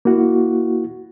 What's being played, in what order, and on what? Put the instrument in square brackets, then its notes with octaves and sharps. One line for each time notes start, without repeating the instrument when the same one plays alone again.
[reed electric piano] A#3 E4 F#4